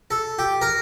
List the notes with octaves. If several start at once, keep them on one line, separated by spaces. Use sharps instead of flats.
A4
G4
A#4